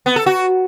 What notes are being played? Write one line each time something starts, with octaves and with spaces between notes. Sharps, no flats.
B3
A4
F#4